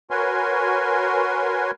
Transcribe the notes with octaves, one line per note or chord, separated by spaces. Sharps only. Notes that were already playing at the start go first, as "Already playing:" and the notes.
F#4 A#4 B4 C#5 G#5 C6